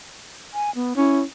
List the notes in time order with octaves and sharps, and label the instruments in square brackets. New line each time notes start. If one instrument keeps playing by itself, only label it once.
[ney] G#5
B3
[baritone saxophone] C#4 [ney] E4